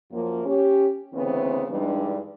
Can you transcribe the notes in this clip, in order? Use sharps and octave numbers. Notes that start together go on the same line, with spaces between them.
F#2 F3 A#3
C#4 G4
D2 C#3 E3 B3 C4
G2 E3 G3 G#3 D4 D#4